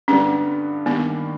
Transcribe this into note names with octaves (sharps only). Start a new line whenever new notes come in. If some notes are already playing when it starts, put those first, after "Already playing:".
G2 D3 G3 B3 C#4
G2 D#3 G3 A#3 B3